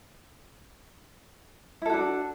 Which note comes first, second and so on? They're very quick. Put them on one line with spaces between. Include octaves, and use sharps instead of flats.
E4 A4 F#4 D4